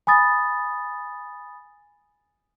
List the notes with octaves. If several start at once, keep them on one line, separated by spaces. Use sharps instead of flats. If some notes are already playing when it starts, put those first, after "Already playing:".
G#5 B5 D#6 A6